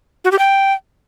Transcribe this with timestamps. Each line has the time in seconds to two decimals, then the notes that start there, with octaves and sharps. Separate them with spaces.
0.24 F#4
0.32 G4
0.39 G5